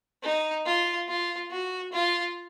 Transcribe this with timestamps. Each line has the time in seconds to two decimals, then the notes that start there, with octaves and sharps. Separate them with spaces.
0.23 D#4
0.66 F4
1.08 F4
1.51 F#4
1.93 F4